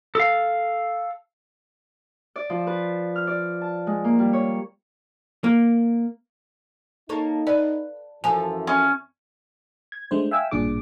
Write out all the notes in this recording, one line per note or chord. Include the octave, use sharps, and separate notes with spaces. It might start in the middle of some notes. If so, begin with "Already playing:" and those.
A4 F5
D5
F3
B4
F6
D5
A5
G#3
A#3
G3
C#5
A#3
A#3 D#4 A4 C#5
B4 D5
F#2 E3 F3 A4 G#5
C#4
G#6
G#3 A3 D4 C5
E5 F5 G5 G#5 E6
A1 G2 A#2 D4 G#4 D6